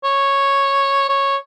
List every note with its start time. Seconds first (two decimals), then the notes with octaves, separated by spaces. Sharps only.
0.04 C#5
1.09 C#5